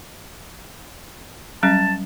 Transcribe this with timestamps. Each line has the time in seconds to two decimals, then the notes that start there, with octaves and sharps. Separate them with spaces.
1.63 F#3 G3 C#4 A5